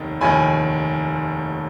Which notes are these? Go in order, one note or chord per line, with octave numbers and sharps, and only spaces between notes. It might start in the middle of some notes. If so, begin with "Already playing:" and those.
Already playing: F1 D#2 D#3
F1 D#2 D#3 G#5 B5